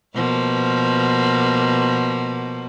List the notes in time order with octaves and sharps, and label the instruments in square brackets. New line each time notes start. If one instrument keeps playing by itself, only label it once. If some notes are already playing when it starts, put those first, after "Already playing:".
[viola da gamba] B2 F3 A#3